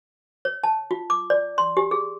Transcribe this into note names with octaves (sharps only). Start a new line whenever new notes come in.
C#5
A5
F4
D6
D5
C6
G4
G#4